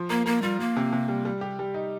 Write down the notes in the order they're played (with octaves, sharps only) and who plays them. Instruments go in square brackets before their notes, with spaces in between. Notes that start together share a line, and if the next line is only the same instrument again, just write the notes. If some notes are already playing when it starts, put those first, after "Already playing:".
Already playing: [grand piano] F3
[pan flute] A#3 [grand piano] A#4
[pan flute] A#3 [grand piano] A#4
[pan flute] G3 [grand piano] F4
[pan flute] A#3 [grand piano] F4
[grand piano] C3
C3
G3
G3
G4
G3
D#4